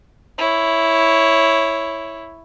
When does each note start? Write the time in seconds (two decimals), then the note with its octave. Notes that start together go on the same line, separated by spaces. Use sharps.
0.38 E4 C#5